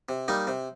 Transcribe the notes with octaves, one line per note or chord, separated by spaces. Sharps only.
C3
G3 A#3 D#4
C3